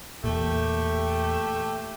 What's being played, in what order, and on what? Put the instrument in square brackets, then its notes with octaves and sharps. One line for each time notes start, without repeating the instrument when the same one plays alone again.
[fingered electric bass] E2 A#2 [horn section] A3 G4